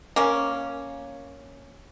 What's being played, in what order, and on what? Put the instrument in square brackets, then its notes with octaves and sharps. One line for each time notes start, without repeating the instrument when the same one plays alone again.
[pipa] A#3 C#4